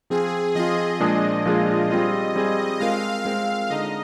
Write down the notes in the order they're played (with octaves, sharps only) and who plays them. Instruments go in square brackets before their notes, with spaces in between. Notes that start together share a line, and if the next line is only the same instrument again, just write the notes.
[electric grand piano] F3 C4 F4 [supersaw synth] G#4
[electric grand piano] F3 C4 F4 [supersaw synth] D#5
[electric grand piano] A#2 F3 G#3 D4 G#4
[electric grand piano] A#2 F3 G#3 D4 G#4 [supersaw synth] F4
[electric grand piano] G3 C4 F4 G#4 [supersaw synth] D#5
[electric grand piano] G3 C4 F4 G#4
[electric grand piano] G#3 C4 F4 A#4 [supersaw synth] F5
[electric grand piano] G#3 C4 F4 A#4
[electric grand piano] D3 G#3 D#4 [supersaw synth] D#5